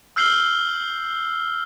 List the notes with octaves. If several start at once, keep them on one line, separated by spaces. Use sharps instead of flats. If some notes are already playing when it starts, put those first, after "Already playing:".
E6 F6 G6 C7 F#7 G7